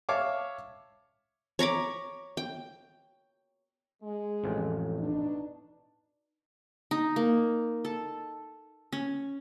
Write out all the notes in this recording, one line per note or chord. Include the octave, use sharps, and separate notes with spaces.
C#5 E5 F5 A5 D6
C#5 A#5 B5 D6
G5
G#3
A1 F2
B2 D4 D#4
D#4
A#3
A4
C#4